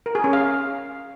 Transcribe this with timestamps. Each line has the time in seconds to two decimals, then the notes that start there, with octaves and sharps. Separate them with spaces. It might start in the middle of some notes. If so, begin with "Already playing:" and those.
0.06 A#4
0.15 G#4
0.24 C#4
0.33 F5